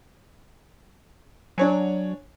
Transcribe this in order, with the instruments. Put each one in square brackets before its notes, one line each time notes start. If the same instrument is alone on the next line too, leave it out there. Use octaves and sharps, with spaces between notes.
[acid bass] F#3 [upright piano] D4 C#5 G#5